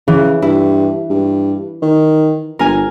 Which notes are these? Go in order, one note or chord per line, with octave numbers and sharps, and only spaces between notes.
C#3 E3
G2 E4
G2
D#3
G1 A#4 G#5